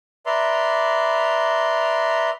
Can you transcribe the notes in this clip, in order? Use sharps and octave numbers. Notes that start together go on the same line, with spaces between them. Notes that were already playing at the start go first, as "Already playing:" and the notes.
B4 D5 E5 A#5 C6